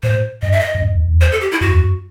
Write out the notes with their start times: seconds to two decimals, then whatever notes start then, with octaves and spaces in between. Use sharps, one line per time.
0.03 A2 C5
0.42 G2 D#5
0.52 E5
0.60 D#5
0.75 G2
0.82 F#2
0.95 E2
1.08 E2
1.21 C5
1.32 A4
1.41 G4
1.52 E4
1.61 F#2 F#4
1.71 E2
1.80 F#2